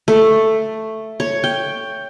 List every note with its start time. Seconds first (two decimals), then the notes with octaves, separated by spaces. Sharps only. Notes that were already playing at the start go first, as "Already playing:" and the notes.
0.08 A3
1.20 C#5
1.44 G5